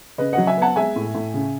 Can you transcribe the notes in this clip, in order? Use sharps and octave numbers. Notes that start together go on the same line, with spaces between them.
C#3 B4 D#5
F#3 D#5 F#5
E5 G#5
B3 F#5 A5
G#3 E5 G#5
A2
A2
C#3